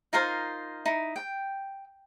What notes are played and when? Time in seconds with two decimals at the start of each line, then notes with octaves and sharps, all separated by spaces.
0.13 D#4 F4 A#4 C5
0.86 D#4 E4
1.16 G5